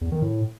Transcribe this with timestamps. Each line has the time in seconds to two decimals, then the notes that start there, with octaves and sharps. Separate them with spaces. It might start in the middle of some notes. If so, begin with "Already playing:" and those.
0.01 E2
0.12 D#3
0.22 A2